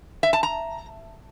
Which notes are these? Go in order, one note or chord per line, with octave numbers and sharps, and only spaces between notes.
E5
A5
A#5